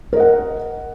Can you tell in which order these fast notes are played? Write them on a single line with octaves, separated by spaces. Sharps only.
A#4 D#5 F#5